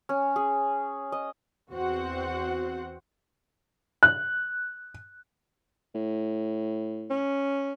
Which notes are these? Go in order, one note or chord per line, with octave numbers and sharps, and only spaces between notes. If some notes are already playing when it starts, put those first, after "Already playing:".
C#4
G#4
D#5
E2 C4 F#4 C5 F#5
F#6
A2
C#4